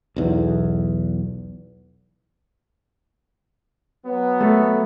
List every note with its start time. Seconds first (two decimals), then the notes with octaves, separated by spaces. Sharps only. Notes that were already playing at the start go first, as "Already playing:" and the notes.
0.16 B1 E2
4.06 F#3 B3
4.41 A3